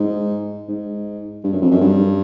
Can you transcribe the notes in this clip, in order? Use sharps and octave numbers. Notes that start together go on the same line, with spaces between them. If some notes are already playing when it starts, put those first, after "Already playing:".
Already playing: G#2
G#2
G2
F#2
F2
F#2
G2